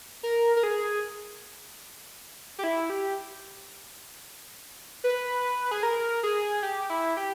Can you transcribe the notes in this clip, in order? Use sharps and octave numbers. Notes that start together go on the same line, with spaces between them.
A#4
A#4
G#4
G4
E4
G4
B4
G#4
A#4
G#4
G4
E4
G4